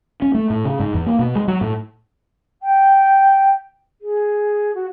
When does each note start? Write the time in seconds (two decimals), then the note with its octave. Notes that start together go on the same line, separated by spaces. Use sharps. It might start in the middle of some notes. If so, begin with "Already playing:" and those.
0.22 C#4
0.34 A3
0.50 A2
0.65 C#3
0.79 G#2
0.94 E2
1.06 A#3
1.19 B2
1.36 G#3
1.48 F#3
1.61 A2
2.61 G5
4.01 G#4
4.74 F#4